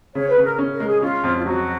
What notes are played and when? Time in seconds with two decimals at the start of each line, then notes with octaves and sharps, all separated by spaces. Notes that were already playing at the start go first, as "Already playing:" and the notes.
0.15 C#3 C#5
0.30 B4
0.37 C#3
0.44 A#4
0.59 C#4
0.73 A#4
0.80 G#3
0.87 G#4
1.02 C#4 F4
1.24 F2
1.37 F4
1.46 F#3 F#4